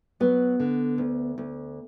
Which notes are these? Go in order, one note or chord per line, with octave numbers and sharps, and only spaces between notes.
F#3 B3
D3
D2
D2